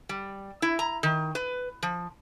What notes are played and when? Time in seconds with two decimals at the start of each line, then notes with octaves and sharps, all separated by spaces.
0.09 G3
0.62 E4
0.79 A#5
1.03 D#3
1.35 B4
1.83 F3